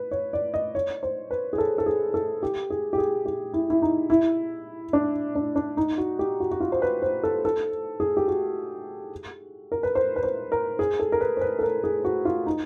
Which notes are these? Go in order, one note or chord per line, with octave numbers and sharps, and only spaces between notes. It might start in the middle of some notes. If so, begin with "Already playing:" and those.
Already playing: B4
C#5
D5
D#5
C#5
C5
B4
G#4
A4
A4
G#4
A4
G4
G#4
G4
G#4
G4
E4
E4
D#4
E4
D4
D4
D4
D#4
F#4
G4
F#4
F#4
F4
C5
B4
C5
A4
A4
G#4
G4
F#4
A#4
B4
C5
B4
C5
A#4
G#4
A4
A#4
B4
C5
B4
A4
A#4
G#4
F#4
F4
D#4